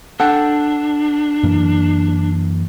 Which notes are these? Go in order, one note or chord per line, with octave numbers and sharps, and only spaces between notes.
D4 A4 F#5 G5
F#2 E3 A#3